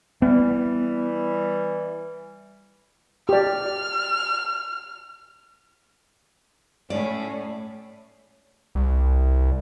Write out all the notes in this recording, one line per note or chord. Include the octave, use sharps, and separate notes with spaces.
E3 G3 B3
G4 D5 F6
A2 C#4 D5
C2